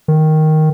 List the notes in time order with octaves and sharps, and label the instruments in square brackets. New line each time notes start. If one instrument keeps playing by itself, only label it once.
[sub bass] D#3